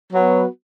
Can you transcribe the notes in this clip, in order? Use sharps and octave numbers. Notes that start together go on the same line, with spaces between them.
F#3 B3 F#4 B4